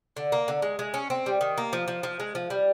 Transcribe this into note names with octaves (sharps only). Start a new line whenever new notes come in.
D3
A#3
D3
G#3
G#3
C#4
C4
G3
D#3
A#3
F3
F3
F3
G#3
F3
G3